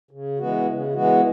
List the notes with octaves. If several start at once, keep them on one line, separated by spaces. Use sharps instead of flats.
C#3
E3 G#3 B3 F#4
C#3
E3 G#3 B3 F#4